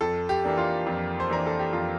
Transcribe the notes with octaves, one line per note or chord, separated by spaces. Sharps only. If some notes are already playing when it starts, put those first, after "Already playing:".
F2 A4
G4
E3 A#3 D4
F4
F2
C5
E3 A#3 D4 A#4
A4
G4
F2 F4